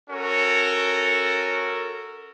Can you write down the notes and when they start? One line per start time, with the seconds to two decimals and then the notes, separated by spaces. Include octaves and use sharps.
0.10 C#4 F#4 A4 A#4